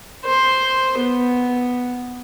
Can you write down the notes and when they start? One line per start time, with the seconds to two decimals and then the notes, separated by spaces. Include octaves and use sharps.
0.25 C5
0.99 B3